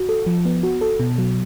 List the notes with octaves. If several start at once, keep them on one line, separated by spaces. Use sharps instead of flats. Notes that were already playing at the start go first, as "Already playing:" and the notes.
Already playing: F#4
A4
F3
B3
F#4
A4
B2
F#3